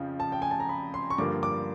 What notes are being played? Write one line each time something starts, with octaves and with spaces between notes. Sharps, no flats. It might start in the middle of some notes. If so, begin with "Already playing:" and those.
Already playing: F2 C#3 F3
A5
G5
G#5
A5
A#5
B5
C6
C#6
G2 D3 F3 A#3 D6
D6